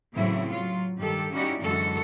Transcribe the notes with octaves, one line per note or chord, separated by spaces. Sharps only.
A2 C#3 E3 F#3 C4 E4
F#3 F4
G2 D#3 G4 A4
C#4 D#4 E4 F#4 G4 D5
F#2 D3 E3 G#3 F#4 A4